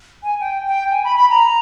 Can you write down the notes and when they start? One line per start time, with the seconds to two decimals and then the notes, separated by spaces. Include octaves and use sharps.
0.23 G#5
0.40 G5
0.66 G5
0.91 G#5
1.04 B5
1.17 B5
1.30 A#5